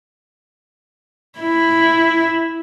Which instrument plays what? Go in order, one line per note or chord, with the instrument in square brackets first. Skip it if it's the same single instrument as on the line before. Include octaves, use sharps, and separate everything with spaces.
[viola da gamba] E4